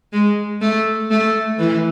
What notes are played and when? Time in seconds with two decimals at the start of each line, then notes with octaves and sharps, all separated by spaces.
0.13 G#3
0.61 A3
1.11 A3
1.59 E3